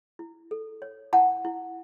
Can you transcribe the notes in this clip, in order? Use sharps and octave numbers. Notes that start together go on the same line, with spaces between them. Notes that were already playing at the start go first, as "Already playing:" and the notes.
E4
A4
C#5
E4 F#5 A5
E4